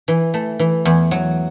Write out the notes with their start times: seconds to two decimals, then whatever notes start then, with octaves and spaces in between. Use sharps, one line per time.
0.08 E3
0.34 A3
0.59 E3
0.85 E2
1.11 F#3